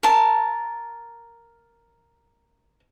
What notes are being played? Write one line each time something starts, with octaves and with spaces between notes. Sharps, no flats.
A#4 A5